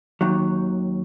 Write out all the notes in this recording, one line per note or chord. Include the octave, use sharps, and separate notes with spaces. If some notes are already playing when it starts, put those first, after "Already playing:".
D#2 D#3 F#3